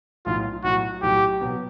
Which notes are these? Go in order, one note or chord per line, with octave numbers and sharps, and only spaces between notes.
B1 A2 F#3 F4
B1 A2 F#3 F#4
B1 A2 F#3 G4
B2 F#3 B3